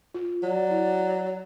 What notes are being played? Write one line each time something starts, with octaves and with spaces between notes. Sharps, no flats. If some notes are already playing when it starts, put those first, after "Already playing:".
F4
F#3 D5
E4